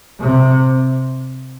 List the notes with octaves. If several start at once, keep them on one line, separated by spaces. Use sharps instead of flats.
C3